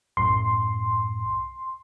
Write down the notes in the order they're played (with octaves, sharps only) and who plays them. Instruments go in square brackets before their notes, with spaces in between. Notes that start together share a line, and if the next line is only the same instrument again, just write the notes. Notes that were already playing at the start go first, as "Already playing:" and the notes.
[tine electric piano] B1 F#2 A2 [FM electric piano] C6